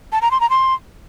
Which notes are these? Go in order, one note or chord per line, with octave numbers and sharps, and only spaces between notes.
A5
A#5
C6
A#5
C6